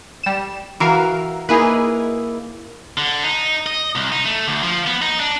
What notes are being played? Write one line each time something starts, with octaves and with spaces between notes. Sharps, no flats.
G3 E7
E3 F#4 A#4 E5 F5
A#3 D#4 E4 G#4 B4
D3
D#4
D#5
C2
D#4
A3
D2
F3
B3
D#4
D4